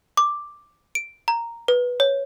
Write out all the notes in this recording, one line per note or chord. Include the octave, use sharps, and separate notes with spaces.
D6
D7
A#5
B4
C#5